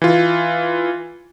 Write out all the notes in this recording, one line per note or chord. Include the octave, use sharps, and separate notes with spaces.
E3 F4